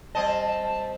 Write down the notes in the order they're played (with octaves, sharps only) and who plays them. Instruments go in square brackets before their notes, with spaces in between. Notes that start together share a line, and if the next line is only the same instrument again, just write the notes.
[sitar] G3 C4 D#5 [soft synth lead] A5